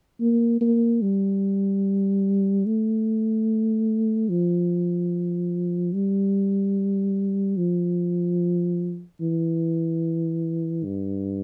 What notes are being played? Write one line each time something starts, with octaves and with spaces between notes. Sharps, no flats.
A#3
A#3
G3
A3
F3
G3
F3
E3
G2